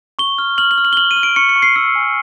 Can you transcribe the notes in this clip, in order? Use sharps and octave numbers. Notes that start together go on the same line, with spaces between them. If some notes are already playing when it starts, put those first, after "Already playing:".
C#6 G7
F6
F6 F#7
F#7
F6
F#7
G7
F6 F#7
D#7
F6
D7
C#6 C#7
C#7
C#6
C7
E6 C7
G#5